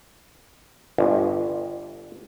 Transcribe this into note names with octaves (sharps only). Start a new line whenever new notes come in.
G1